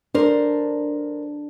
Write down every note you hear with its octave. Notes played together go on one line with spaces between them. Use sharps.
D4 A#4 C5